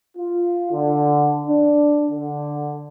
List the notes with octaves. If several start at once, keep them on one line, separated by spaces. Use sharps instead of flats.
F4
D3
D4
D3